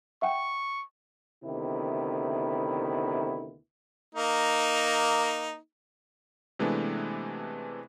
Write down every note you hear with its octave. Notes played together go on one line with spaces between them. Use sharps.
E5 F#5 G5 C#6
D2 C3 D#3 B3 E4
A#3 D#4
C3 E3 G#3 A3 B3 D4